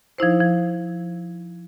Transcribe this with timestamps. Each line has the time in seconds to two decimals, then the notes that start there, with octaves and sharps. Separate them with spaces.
0.18 F3 D#4 E4 C5
0.40 F3